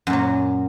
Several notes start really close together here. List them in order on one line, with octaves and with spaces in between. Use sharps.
F#2 A#2 F#3